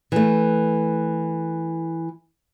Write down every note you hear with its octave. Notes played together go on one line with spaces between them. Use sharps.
E3 A3